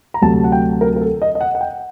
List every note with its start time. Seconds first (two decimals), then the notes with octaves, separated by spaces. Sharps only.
0.14 A#5
0.21 D2 C3 F#3 A5
0.44 F#5
0.52 G5
0.81 A#4
0.96 A#4
1.01 A4
1.22 D#5
1.35 D#5
1.41 F#5
1.55 F#5
1.61 G5